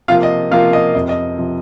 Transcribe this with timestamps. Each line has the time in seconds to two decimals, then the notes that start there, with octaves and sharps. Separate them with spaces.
0.08 C3 F3 A#3 F4 F5
0.23 D#5
0.51 C3 F3 A#3 F4 F5
0.73 D#5
0.95 F2 C3 F3 D#5
1.09 D#5
1.38 C3 F3